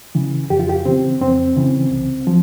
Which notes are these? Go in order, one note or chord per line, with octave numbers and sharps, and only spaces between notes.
C#3 E3
F2 G4
F4
G4
C#3 E3 C4
F2 C4
C#3 E3
C2
F3